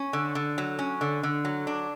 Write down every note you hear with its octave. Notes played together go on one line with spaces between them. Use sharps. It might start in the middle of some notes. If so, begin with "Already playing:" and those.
Already playing: C#4
D3
D3
F#3
C#4
D3
D3
F#3
D4